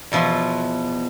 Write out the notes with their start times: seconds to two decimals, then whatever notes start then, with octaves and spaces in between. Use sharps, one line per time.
0.12 E2 B2 F3 E4 C6